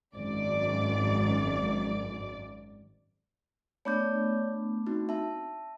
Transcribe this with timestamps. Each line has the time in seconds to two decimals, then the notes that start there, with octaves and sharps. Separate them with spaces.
0.14 G#1 F#2 D5
3.85 A3 B3 D4 C#5 D5 G6
4.86 C4 D#4 F#4
5.09 E5 A5